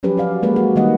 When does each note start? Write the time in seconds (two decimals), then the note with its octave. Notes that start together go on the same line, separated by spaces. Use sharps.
0.03 F3 F#3 C#4 G4 B4
0.17 F#4 D5 F5
0.43 G#3 A#3 B4 C#5
0.56 F#4
0.76 D#3 G3 A#3 D#5 F#5